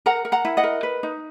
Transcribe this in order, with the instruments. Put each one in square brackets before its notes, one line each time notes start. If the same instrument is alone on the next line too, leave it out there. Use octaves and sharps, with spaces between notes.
[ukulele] A#4 F#5 A#5
A#4
F#5 A#5
E4
D#5 F#5
A#4
B4
D#4